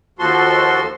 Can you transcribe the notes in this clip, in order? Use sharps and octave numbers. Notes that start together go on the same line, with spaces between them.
D#2 F3 F#4 A4 C6